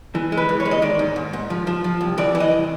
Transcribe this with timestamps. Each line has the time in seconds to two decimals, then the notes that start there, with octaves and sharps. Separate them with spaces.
0.15 E3
0.32 G#3
0.37 B4
0.49 E3
0.60 C#5
0.65 G#3
0.71 D#5
0.82 D#3 D5
0.99 G#2
1.16 G#2
1.33 G#2
1.50 F3
1.67 F3
1.84 F3
2.01 C2
2.18 E3 D5
2.35 E3
2.40 D#5
2.51 C2